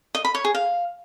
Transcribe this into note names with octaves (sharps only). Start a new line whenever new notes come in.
D#5
B5
C#5
G#4
F5